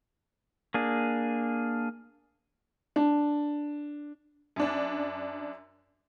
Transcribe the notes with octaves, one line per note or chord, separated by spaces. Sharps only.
A#3 D4 G#4
D4
F#2 D4